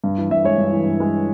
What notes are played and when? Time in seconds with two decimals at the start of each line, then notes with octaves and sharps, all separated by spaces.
0.04 G2
0.18 E3
0.31 G2 E5
0.44 G#3 C#5
0.58 G2
0.72 E3
0.86 G2
1.00 G#3